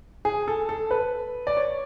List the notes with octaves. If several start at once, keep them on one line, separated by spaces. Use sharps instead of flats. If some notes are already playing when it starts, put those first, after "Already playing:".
G#4
A4
A4
B4
D5
C#5